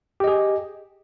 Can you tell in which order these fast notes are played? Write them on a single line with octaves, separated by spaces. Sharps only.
G4 D#5 G#4